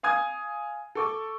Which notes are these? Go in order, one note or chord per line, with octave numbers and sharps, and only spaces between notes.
F5 G#5 D#6 G#6
A4 C#6 D6